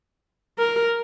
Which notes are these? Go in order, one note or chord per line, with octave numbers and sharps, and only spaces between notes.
A#4